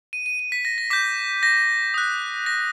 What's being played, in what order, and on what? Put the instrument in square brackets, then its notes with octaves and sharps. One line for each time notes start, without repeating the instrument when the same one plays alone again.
[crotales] D#7
D#7
D#7
B6
A#6
A#6
D6 G6 B6
A#6
D#6 F#6
A#6